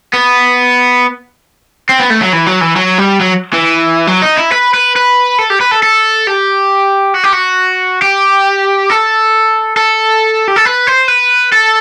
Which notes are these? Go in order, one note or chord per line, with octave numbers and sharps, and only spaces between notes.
B3
C4
B3
A3
F#3
E3
F#3
E3
F#3
G3
F#3
E3
F#3
D#4
E4
B4
B4
B4
A4
G4
B4
A4
A4
G4
F#4
G4
F#4
G4
A4
A4
G4
A4
B4
C5
B4
A4